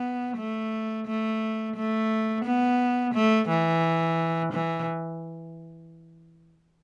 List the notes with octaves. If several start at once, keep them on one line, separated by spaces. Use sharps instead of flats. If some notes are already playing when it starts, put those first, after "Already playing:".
Already playing: B3
A3
A3
A3
B3
A3
E3
E3